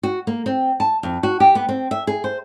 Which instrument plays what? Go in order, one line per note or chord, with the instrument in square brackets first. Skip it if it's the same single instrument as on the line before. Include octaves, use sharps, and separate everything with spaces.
[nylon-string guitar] F#4
A#3
C4
A5
F2
F#4
G4
B3
C4
E5
G#4
C5